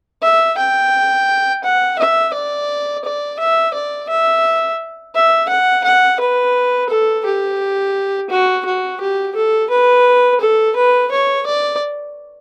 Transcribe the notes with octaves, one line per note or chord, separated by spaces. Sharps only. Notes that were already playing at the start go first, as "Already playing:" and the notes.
E5
G5
F#5
E5
D5
D5
E5
D5
E5
E5
F#5
F#5
B4
A4
G4
F#4
F#4
G4
A4
B4
A4
B4
C#5
D5